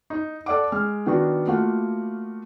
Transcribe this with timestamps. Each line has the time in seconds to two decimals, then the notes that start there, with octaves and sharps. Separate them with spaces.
0.10 D#4
0.46 A4 D5 F#5 D6
0.72 G#3 F6
1.07 D#3 B3 D4 F#4
1.47 A3 A#3 F4 F#4 F#5